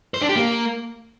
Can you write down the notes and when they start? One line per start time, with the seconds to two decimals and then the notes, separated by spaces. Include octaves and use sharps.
0.14 C5
0.22 D4
0.29 G4
0.37 A#3